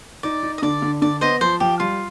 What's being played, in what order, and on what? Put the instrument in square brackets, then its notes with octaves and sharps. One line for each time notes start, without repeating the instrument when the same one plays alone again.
[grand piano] D#4 [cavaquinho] D5
[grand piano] D#4
[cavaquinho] D#5
[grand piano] D3 [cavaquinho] D5
[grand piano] D3
[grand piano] D3 [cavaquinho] D5
[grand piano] B3 [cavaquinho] C5 D#5
[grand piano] F3 [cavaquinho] C5
[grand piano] F3 [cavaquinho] G4
[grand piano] G3 [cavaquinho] F4